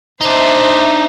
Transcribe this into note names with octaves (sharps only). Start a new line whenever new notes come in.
D4 D#4 C5 E5